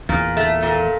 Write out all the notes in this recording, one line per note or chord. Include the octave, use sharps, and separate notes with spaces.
E2 A#2
A3
A#2